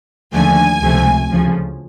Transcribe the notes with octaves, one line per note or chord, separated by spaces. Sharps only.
D#2 D3 F3 A3 G#5
C#2 C3 F3 A3
D2 C#3 F3